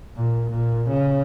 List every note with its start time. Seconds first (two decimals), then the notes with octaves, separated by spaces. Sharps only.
0.16 A#2
0.50 A#2
0.90 C#3